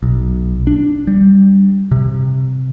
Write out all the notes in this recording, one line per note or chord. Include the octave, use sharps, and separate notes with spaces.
B1
D4
G3
C3